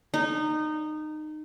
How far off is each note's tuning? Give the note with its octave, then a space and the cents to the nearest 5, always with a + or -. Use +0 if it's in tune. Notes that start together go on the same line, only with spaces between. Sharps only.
D#4 -20